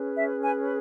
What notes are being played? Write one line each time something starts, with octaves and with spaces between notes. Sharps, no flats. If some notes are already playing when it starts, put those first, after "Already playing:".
Already playing: C#4 G#4 B4
E5
G#5